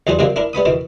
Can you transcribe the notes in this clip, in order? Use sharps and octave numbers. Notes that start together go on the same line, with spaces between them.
E2 F#3 G3 G#4 C5
C3 D#3 F#3 G3 A#3
D4 E4 A#4
G3 B3 B5 D#6
B2 D#3 E3